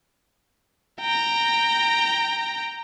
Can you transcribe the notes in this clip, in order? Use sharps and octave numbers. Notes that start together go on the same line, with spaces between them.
G5 A#5